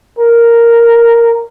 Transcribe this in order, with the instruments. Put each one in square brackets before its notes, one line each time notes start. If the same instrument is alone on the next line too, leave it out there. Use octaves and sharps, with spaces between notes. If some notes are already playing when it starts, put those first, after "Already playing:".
[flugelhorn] A#4